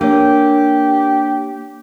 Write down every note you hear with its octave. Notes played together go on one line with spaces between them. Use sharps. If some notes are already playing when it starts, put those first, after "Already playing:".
A#3 D4 G4 C#5